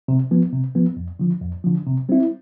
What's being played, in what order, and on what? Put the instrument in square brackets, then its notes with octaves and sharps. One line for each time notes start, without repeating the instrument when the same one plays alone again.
[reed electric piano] C3
F3 B3
C3
F3 B3
F2
D3 F3
F2
D3 F3
C3
G3 C4 E4